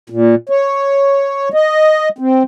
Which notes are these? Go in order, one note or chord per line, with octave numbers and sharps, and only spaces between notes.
A#2
C#5
D#5
C4